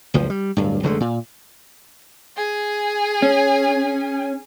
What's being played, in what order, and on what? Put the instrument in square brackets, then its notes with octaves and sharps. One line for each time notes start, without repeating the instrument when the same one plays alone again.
[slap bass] F#1 C#2 F3
G3
D1 G2
F1 D3 G#3 A3
A#2
[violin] G#4 G#5
[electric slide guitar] C#4